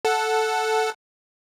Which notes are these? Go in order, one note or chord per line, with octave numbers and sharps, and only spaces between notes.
A4 F#5